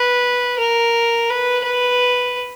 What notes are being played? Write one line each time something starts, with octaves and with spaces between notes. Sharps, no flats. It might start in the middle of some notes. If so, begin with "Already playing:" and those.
Already playing: B4
A#4
B4
B4